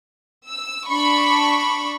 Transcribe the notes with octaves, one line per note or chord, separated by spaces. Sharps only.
E6
D4 B5 C#6